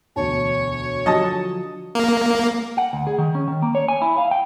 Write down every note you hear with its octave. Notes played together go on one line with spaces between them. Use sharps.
E1 D2 C#5 A5
D3 F3 F#3 D#5 A5 D#6
A#3
F#5
D2
G#4
D#3
C#4
D#3
A#3
C#5
G#5
E4
F5
G5